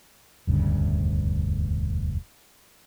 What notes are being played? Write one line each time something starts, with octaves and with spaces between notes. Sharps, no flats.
E1 D2 G2 C#3